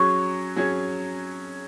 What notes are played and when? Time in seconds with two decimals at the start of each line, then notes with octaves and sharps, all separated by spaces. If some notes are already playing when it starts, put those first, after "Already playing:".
Already playing: F#3 C#4 G#4 C#5 C#6
0.56 F#3 C#4 G#4 C#5